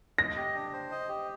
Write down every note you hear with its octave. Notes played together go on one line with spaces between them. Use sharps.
D#5 A#6
G4
D4
C5
D#5
G4